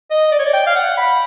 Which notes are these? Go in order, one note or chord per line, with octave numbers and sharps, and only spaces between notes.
D#5
D5
C#5
D5
G5
F5
F#5
B5